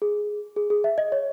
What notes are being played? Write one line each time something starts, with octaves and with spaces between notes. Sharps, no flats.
G#4
G#4
G#4
E5
D#5
C#5